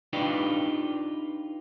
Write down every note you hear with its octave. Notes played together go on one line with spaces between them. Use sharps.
D4 D#4 F4 G4 B4 D5